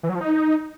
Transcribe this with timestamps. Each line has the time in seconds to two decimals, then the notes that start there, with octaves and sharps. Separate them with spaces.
0.03 E3
0.09 F#3
0.15 F3
0.21 D#4